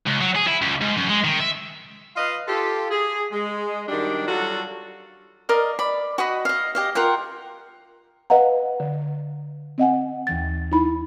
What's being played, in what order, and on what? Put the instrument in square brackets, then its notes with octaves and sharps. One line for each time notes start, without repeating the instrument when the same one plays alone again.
[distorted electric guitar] C#2
F#3
G#4
E4
C#2
G#2
F#2
G#3
D#3
E5
[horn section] F4 B4 D#5 F5
F4 G4 A4
G#4
G#3
F#2 D#3 G3 D4 D5 G5
F#3 G3 F4 F#4 A4
[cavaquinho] A#4 D5 D#5 F5
D5 B5
F#4 D#5 B5 D#6
D#5 F5
G4 D#5 F5
F4 A#4 F#5 G5
[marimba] B4 D#5 F5 F#5 A#5
D3
C4 D#5 F#5 G#5
D#2 E3 A6
D#4 E4 B5